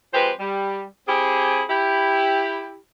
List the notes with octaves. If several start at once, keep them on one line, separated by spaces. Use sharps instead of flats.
F3 G#3 C4 G4 B4 C5
G3
C4 E4 G4 G#4
E4 G4